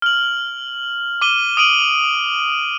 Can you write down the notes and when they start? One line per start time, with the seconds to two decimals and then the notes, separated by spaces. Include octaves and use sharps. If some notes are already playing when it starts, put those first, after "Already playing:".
0.02 F6 F#7
1.21 D6 D#7 G7
1.57 D#6 D7 D#7 F#7